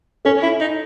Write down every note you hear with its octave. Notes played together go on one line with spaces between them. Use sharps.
C#4 A4
E4
D#4